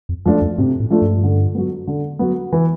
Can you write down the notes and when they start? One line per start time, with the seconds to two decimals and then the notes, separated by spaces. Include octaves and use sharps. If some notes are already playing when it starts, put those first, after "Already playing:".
0.09 F2
0.25 F2 F3 A3 D4 F4
0.42 F2
0.58 G#2 C3
0.80 A2
0.90 F3 A3 D4 F4
1.02 G2
1.23 D3
1.55 F#3 B3
1.87 D3
2.19 F#3 B3
2.52 E3